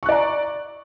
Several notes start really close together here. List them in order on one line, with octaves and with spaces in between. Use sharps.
C#6 F#6 D5 A#5